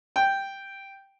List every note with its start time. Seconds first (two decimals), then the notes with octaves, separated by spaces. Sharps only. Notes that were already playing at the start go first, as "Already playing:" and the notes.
0.16 G5